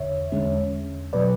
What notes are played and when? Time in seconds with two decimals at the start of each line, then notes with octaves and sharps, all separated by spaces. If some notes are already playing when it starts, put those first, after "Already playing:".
Already playing: E2 D3 C#5 E5
0.32 E2 D3 G#3 C#4
1.13 B2 F#3 B4 D5